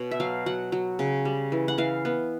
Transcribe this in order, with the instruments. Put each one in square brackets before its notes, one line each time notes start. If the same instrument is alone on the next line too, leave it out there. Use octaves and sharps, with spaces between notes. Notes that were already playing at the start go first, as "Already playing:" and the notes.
Already playing: [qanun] B2 C#5
E5
F#3 F5
F#3 F#5
F#3
C#3
G3
E3
F#5
E3 F5
B3